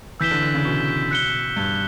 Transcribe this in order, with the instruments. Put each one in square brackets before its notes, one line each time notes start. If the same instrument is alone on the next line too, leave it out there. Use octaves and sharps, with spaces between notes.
[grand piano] E3 [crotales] E6 G6 B6 E7 G7
[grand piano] D3
D3
C#3
B2
[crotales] F#6 C#7 G7
[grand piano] G2